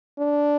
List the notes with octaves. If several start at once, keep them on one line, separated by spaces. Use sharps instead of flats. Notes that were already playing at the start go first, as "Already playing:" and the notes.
D4